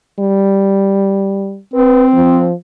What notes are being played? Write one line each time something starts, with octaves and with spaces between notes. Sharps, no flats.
G3
C4 B4
F3